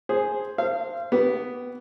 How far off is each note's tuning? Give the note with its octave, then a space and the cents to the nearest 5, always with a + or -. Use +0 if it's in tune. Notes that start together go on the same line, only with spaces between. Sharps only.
G#4 +0 C5 +0
C5 +0 F5 -30
B3 +0 G4 -25